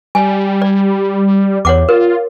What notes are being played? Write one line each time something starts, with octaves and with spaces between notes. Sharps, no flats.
G3 G#5
D5
E2 C#5 F#5 D6
F4 A#4